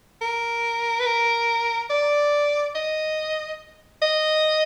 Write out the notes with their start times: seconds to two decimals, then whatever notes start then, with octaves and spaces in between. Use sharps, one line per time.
0.21 A#4
0.99 B4
1.06 A#4
1.90 D5
2.75 D#5
4.02 D#5